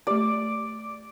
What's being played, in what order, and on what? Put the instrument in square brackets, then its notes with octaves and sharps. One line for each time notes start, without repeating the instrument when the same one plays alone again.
[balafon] A3 G4 [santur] D5